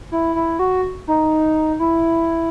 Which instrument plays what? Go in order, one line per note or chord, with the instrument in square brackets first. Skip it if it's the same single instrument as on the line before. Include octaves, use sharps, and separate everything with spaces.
[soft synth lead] E4
E4
F#4
D#4
E4